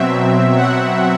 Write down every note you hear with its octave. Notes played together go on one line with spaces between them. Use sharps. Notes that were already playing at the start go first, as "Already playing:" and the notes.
Already playing: B2 F#3 C4 E5
F#5